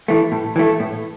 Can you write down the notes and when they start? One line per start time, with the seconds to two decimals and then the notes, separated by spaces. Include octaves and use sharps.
0.08 E3 A3
0.32 A2
0.56 E3 A3
0.80 A2